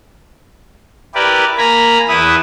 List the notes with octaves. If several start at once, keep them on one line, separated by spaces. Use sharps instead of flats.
E4 G4 A#4 B4 D5
A#3 G#5 A#5 B5
E2 E3 E4 B4 E5 D#6